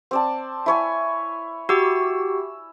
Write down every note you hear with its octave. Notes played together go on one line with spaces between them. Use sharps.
C4 D5 A5
E4 C#5 G#5
F#4 G4 E6